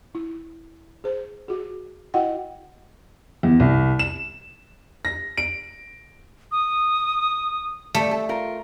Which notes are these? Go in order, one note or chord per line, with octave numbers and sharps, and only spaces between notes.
E4
G#4 C5
F#4 G#4
E4 F#4 D#5 F#5 G5
E2
C2
E7
A#6
D7
D#6
G3 A3
A4
F4 A#4